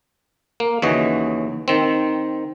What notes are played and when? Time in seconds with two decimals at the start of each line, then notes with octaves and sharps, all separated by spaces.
0.60 A#3
0.82 D#2 C#3 E3 F#4 D#5
1.68 D#3 C4